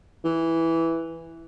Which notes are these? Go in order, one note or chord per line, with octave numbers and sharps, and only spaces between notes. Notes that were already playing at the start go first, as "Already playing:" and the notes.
E3